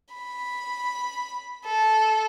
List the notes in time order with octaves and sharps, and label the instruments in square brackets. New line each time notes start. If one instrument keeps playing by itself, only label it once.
[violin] B5
A4